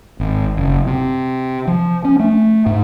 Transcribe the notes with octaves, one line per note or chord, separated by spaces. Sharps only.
G#1
F#1
C3
F3
C#4
A3
G#2